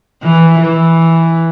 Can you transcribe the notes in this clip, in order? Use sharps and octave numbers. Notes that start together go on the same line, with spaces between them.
E3
E3